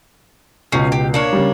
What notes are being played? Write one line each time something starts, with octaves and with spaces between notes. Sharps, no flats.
C#2 B2 C#4 D#4 C7
G4
A#3 D4 C#5 D5
C#3 G3